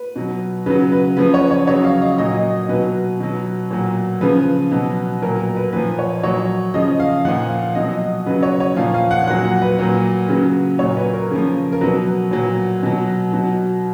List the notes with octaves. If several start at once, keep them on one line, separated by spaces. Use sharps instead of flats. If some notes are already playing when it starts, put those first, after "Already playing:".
Already playing: B4
B2 F#3
C#3 F#3 B4
B4
C#3 F3 B4
C#5
C#5
C#3 F#3 C#5
F5
D#5
A#2 F#3 D#5
B2 F#3 B4
B2 F#3
A#2 F#3
C#3 F3 B4
B2 F#3
A#2 F#3 A#4
A#4
B4
A#2 F3 B4
C#5
A#2 F#3 C#5
C#3 F3 D#5
F5
A#2 F3 F#5
F5
B2 F#3 D#5
C#3 F#3 B4
C#5
C#5
A#2 F3 F5
F5
F#5
A#2 F#3 F#5
F#5
B4
A#2 F#3
C#3 F#3 B4
A#2 F#3 C#5
B4
A#4
C#3 F3
A#4
B2 F#3 B4
A#2 F#3
B2 F#3
B2 F#3